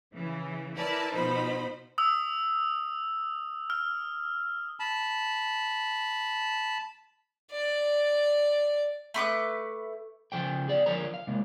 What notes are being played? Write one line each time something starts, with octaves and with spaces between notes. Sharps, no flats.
C#3 E3
E4 A#4 B4 D5 A5
B2 F3 D#4 C5 B5
D#6 E6
F6
A5 B5
D5
A3 B4 D6 D#6
C#3 F3 A4 G5
G#4 D5 F5
D3 F3 A#4 C#5 A#5
F5
C3 G#3 A#3